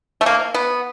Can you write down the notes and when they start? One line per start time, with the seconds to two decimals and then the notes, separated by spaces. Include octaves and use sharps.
0.21 A3
0.26 A#3
0.54 B3